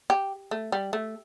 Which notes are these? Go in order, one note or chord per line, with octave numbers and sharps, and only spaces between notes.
G4
A3
G3
A3